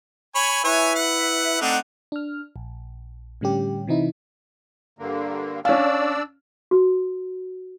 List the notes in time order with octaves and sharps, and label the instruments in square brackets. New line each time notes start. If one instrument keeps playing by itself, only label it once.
[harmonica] C#5 G#5 B5
[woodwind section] E4 B4 E5 [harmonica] C#5 G#5
[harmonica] F#5
[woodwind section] A3 C4 F#5 [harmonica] D4 D#4
[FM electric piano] D4 F6
A#1
A2 D3 G3 C#4 G4
C3 E3 C4 D#4 E4
[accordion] G2 D3 A#3
[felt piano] C#4 F5 [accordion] D4 D5 E6
[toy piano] F#4